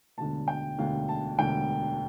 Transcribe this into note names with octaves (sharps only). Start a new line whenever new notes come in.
E1 D2 D3 A5
G5
E1 D2 D3 F5
A5
E1 D2 D3 G5